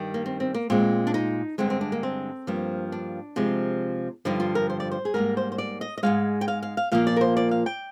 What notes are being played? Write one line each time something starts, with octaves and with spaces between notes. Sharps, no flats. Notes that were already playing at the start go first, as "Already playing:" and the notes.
Already playing: G2 D#3 G3
A#3
C4
C4
A#3
A#2 G#3 C4
D4
D#4
G2 D3 G#3 C4
C4
D4
A#3
C4
G2 F3 A#3
D4
C3 F3 G#3
G2 D3 F3 D#4
F4
A#4
C5
D5
C5
G#4
G#2 G3 A#3 A#4
C5
C5
D5
D#5
D#5
G#2 F3 G#3 F5
G5
F5
F5
F5
A#2 F3 A#3 F5
D5
A#4
C5
D5
F5
G5